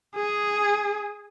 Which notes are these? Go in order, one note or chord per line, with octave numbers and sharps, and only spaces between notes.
G#4